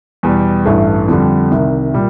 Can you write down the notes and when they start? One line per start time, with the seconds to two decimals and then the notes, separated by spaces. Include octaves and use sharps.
0.23 E2 B2 G3
0.66 A1 G2 E3 A3
1.08 F2 D3 G3
1.51 C2 C3 D#3
1.94 A#2 G3